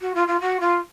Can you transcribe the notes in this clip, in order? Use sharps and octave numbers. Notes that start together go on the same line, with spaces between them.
F#4
F4
F4
F#4
F4